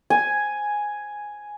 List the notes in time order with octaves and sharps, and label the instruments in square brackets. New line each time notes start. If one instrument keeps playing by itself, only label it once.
[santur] G#5